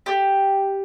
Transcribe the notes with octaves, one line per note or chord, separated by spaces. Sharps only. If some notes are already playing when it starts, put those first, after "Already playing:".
G4